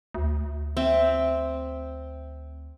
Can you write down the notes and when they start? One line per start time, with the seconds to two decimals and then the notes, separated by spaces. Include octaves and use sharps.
0.14 D2
0.77 C4 E5